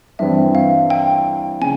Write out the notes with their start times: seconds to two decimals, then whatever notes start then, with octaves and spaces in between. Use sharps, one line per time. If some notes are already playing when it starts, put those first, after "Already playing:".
0.19 G2 E3 G3 C4 E5
0.55 F5
0.90 G5
1.61 C#3 G#5